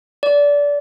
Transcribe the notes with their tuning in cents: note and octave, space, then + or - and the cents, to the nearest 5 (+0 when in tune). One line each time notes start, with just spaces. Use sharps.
D5 -25